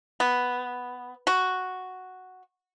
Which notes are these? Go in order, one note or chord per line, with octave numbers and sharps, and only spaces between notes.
B3
F#4